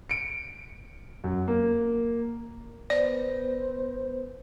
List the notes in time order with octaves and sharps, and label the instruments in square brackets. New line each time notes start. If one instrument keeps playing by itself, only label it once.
[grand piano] C#7 D7
F#2
A#3
[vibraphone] B3 B4 [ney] C5 [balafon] D5